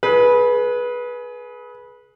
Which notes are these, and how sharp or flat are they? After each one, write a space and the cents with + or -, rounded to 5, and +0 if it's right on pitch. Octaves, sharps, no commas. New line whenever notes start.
G#4 +25 B4 -15